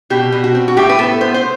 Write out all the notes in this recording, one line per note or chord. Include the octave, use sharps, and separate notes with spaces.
B2 G4
B2
F#4
C4
F#4
A2 G4
B4
B3 A4
B3 C5
C5